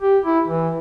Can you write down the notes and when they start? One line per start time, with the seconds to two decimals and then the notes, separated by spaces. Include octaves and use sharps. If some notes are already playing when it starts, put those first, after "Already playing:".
0.01 G4
0.25 E4
0.47 E3